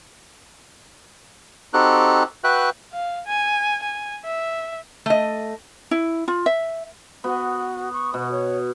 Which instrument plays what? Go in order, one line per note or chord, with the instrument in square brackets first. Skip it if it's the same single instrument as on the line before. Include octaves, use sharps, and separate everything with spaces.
[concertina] C4 D#4 F#4 G4 A4 F#6
F#4 B4 E5 G5 F#6
[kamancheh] F5
G#5
G#5
E5
[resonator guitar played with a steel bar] A3 D#5
[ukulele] E4
F4
E5
[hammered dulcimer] B3 [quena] F#4
[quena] C#6
[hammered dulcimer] B2 [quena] F#4
[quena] C#5